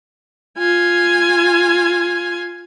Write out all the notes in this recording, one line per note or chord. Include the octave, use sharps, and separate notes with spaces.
F4 G#5